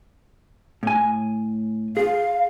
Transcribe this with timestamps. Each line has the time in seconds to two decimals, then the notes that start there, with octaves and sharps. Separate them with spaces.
0.83 A2 G#5
1.97 G#4 F5